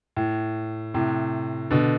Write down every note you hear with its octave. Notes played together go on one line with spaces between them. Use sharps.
A2
A2 C3
B2 D3